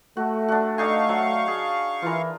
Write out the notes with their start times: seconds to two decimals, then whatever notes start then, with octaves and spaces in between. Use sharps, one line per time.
0.17 A3 F#4
0.48 D4 F#4
0.78 D4 D#4 F5 G#5 C#6
1.09 F#3
1.48 G#4
2.02 E3 F4 A#4